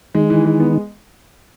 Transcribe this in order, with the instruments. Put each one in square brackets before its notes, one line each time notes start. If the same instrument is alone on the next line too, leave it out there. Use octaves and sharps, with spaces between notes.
[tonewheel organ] D#3 [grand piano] G#3
[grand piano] E3
G#3
B3